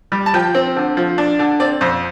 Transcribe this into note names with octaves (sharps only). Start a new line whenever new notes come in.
G3
A5
F3 G5
C4
D3
F3
D4
D3
C4 D5
F2 C5